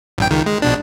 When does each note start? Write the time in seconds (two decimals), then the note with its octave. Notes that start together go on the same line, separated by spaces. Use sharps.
0.18 A1 G2 G5
0.30 C#2 D#3
0.46 G#3
0.62 A#1 B2 D4